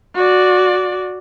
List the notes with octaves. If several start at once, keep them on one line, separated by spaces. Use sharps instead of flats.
F#4 D5